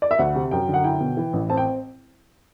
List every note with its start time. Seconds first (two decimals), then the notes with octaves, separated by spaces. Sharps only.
0.02 D5
0.11 E5
0.19 D2 F#5
0.35 C3
0.51 F#2 G5
0.68 D3
0.74 F#5
0.84 E4 G5
1.00 B2
1.17 E3
1.33 A1
1.50 C4 A5
1.57 G5